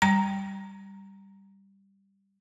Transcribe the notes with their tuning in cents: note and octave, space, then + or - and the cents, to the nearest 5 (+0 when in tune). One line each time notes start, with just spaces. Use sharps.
G3 +0 A#5 +0